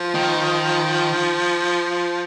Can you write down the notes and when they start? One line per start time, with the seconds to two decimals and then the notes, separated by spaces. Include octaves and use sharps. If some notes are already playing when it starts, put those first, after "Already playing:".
Already playing: F3
0.15 D#3